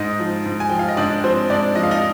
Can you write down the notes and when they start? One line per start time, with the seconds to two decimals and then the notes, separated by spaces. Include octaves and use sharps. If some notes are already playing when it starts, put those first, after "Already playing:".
Already playing: G#2 D#4 D#5
0.20 F3
0.45 G#2
0.60 G#5
0.69 F3 G5
0.79 F5
0.89 D#5
0.97 G#2 D4 D5
1.24 F3 C4 C5
1.50 G#2 D4 D5
1.75 F3 D#5
1.83 F5
1.91 D#4 D#5